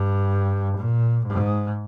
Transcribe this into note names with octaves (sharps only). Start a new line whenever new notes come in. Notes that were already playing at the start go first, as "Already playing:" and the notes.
Already playing: G2
A#2
G#2